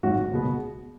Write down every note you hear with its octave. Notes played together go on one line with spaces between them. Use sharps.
G#1 G#2 D#3 F#3 F#4
C#2 B2 G#3 B3